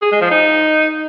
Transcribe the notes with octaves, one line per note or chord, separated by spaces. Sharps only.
G#4
G#3
F3
D#4